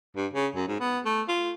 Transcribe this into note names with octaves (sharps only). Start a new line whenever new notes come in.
G2
C#3
F#2
G#2
B3
A3
F4